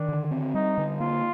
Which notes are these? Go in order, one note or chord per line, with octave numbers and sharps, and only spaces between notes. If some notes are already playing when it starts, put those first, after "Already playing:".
Already playing: D#3 D4
D3
C4
G3 D#4
D3
A#3 F4